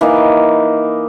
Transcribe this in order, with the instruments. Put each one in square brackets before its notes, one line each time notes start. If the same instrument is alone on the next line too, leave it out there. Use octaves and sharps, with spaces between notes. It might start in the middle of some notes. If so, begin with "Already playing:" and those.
[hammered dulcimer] E3 A#3 D#4